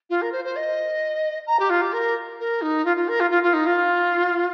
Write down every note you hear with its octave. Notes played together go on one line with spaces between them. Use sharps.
F4
A#4
C5
C5
D#5
A#5
G4
F4
G4
A#4
A#4
D#4
F4
F4
A#4
F4
F4
F4
D#4
F4